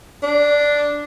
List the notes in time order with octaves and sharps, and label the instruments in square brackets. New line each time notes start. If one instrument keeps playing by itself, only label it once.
[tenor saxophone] D4